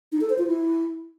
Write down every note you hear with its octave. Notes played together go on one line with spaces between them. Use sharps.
D#4
A4
C5
F4
E4